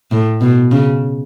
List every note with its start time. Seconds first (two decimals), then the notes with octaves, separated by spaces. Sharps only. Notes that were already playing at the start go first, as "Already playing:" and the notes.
0.12 A2
0.41 B2
0.71 C#3